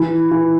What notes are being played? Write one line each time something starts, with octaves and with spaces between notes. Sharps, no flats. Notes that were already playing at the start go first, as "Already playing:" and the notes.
Already playing: E3
E3